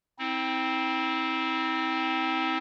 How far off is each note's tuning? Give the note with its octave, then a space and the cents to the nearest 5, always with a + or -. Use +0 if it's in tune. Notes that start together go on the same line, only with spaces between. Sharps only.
C4 +0 E4 -45